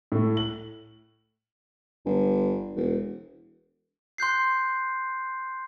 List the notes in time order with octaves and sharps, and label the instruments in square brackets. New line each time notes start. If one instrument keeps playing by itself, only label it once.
[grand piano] A2 A3
F#7
[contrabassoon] G1
E1
[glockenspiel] C6 F#6 G6 C7